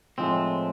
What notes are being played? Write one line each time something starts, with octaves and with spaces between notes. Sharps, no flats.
A2 F3 G#3 C4